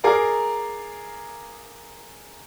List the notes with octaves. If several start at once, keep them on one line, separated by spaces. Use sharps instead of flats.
G#4 A#4 D5 F5 A#5